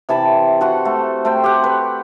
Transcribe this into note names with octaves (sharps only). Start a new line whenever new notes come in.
C3 E3 A5 B5
F#4 A4 C5 F#5
A3
A3 C5 G5
G4 C5 F#5
B4